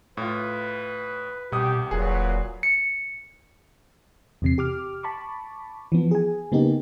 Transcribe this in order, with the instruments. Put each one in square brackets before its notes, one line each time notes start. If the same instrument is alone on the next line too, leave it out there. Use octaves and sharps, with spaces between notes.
[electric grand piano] A2 F4 [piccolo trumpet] B4
[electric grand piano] C2 D#6 [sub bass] B2 [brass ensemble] G4
[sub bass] E1 [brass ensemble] A#2 F#3 A#3 [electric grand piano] G#4 [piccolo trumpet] B4
[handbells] C#7
[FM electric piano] E2 C3 C7
G4 D6 F6
A5 B5 C#6 D6
E3 F3 B3
G#4 G#5
C#3 A#3 B3 D#4 G4